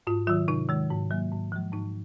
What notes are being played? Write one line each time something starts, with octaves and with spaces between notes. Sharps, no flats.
G#2 F4
D#3 F#3 F4
C3 D#4
D#3 G#3
G#2
F#3 A#3
G#2
F3 G#3
G#2 D#4